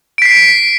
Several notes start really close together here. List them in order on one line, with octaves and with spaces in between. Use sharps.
D7 B6 C7